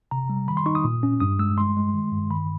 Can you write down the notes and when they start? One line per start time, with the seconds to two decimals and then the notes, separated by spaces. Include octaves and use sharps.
0.11 C3 A#5
0.30 G3
0.48 D#3 B5
0.57 C6
0.66 D#4 C#6
0.75 D#6
0.84 A#2
1.03 C#4
1.20 G2 D#6
1.39 G#3 E6
1.58 G#3 C6
1.76 G#3
1.94 D#3
2.12 G2
2.30 D#3 B5